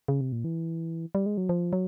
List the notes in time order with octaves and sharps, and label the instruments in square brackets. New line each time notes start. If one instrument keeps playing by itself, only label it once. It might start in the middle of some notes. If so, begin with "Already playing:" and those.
[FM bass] C#3
C3
A#2
E3
G3
G#3
F#3
F3
F#3